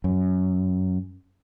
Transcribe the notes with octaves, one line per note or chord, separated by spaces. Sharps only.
F#2